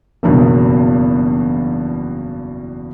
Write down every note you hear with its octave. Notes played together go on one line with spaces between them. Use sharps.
F#1 E2 G2 B2